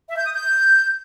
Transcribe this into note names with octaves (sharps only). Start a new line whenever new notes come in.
E5
G6
D#6
G6